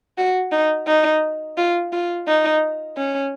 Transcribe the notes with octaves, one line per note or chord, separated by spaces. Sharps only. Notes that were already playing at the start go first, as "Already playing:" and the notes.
F#4
D#4
D#4
F4
F4
D#4
C#4